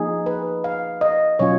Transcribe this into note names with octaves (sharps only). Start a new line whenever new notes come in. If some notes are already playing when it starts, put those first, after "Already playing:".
Already playing: F3 A#3 D#4 G#4
B4
F5
D#5
B2 F#3 C#4 F4 C#5